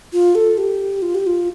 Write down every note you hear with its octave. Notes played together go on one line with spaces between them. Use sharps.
F4
A4
G4
F4
G4
F4